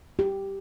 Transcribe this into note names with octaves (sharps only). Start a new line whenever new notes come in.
G4